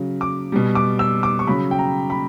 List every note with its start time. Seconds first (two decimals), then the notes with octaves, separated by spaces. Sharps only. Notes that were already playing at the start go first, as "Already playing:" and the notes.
Already playing: C#3 F#3
0.21 D6
0.52 B2 G3
0.75 D6
0.99 E6
1.23 D6
1.39 C#6
1.47 C#3 F#3 B5
1.71 G5
1.79 A#5
2.10 B5